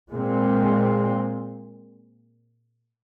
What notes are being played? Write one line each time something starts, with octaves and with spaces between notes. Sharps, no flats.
A#2 G#3 C4